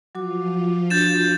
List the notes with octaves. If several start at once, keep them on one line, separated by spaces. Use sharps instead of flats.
F3 F#3 F4 F#4 D6
D4 F#4 G6 A6 E7